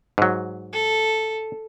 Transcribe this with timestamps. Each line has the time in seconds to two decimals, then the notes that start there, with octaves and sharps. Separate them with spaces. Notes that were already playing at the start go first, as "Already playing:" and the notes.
0.18 G#2 F#3
0.73 A4